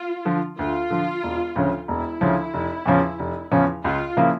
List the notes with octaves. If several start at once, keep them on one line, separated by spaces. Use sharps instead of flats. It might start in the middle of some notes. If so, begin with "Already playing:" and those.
Already playing: F4
D3 F3
D2 F4
D3 F3
E1
D2 C#3 F3 C#4
E1 E4
D2 C#3 F3 C#4
F1
E2 C#3 F3 C#4
F1
E2 C#3 F3 C#4
C#2 F4
C#3 F3 A#3 E4